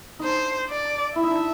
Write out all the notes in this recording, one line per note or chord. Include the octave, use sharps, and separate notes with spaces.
D4 D#4 C5
D5
E4 E5
D#4
D4